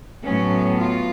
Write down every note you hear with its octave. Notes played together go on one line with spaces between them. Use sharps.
A2 F#3 B3 C#4
F4